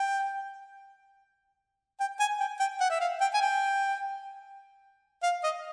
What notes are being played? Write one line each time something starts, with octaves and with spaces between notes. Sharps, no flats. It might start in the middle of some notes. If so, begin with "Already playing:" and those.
Already playing: G5
G5
G#5
G5
G5
F#5
E5
F5
G5
G#5
G5
F5
D#5